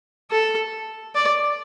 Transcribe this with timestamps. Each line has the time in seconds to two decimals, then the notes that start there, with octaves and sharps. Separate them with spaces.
0.31 A4
1.15 D5